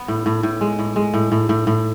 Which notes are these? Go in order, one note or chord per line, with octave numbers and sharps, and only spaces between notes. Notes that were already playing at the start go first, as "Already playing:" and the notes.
Already playing: B3
A2
A2
A2
G#3
A2
G#3
A2
A2
A2
A2